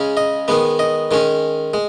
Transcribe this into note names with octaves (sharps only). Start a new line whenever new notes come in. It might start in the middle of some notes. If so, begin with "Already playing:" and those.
Already playing: C#3 G#3 C#4
D#5
D#3 G#3 B3
D#5
D#3 G#3 C#4
G#3